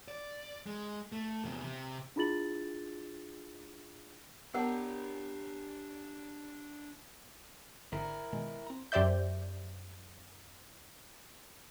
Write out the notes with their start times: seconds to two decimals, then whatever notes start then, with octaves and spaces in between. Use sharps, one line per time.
0.08 D5
0.66 G#3
1.12 A3
1.44 E2 C3
1.62 C3
2.16 D4 E4 F4 G#4 A6 F#7
4.54 B3 D4 G4 A#4 C#5 F#5 A5 A#5
7.93 G#1 G#2 D3 E4 A#4
8.33 B2 D#3 G#3
8.67 C4 A#5
8.92 F#2 G4 C5 D5 E5 G6